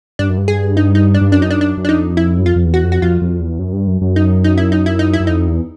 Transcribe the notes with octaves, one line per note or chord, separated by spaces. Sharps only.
G2 D4
F#2
G2
G#4
D#4
D#4
D4
G2
F#2 D4
D#4
D4
D4
F#2
D4
F2 D#4
E4
F#2
F2 F4
F2
E2
F#4
F2
F#4
F2 F4
F2
E2
F#2
G2
F#2
F#2
D#4
D#4
E4
D#4
E4
D#4
E4
F#2
F2 D#4
E2